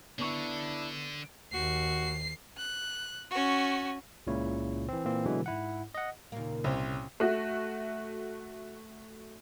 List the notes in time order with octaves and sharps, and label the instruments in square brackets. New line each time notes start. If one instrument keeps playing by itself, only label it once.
[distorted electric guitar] D3 [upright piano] B3 C#6 [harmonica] D4 E4
[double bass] D#2 [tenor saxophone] F#4 [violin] C7
[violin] F#6
C#4 F#4
[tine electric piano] C#2 A#2 C#3 E4 C#5
E3 C4
A#2 E3 A#3 C4
B2 D3 E3 F#3 G#3
G#2 E4 F#5
D#5 F#5
[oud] D#2 A#3 [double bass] A#2 C#3
[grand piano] C2 [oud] C#4 C5
[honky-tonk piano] A3 F#4